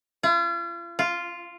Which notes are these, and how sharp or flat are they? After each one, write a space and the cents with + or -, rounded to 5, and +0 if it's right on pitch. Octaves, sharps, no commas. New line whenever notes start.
F4 -40
F4 -5